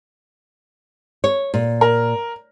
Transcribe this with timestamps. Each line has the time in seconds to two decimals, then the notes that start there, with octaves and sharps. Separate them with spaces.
1.24 C#5
1.54 A#2
1.81 A#4